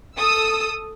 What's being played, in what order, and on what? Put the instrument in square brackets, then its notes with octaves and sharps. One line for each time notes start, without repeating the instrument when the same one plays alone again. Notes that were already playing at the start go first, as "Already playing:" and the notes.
[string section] A4 D#6 E6